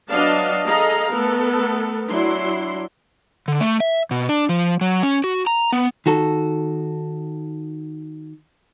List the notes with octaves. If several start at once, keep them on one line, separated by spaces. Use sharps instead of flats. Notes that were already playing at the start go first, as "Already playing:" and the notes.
F#3 B3 D4 D#5 F5 A5
G#4 A4 D#5 F5 A#5
A3 B3 A4 A#4
F#3 D4 E4 C6
D3
A3
E5
B2
D4
F3
F#3
C#4
F#4
A#5
B3
D#3 F#4 A4